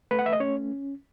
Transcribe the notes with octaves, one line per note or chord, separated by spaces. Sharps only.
A3 B4
F#5
E5
D#5
C#4 C#5